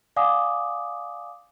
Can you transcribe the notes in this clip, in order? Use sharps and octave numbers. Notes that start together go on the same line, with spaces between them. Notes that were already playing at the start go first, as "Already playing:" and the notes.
D5 F5 F#5 G#5 D6 D#6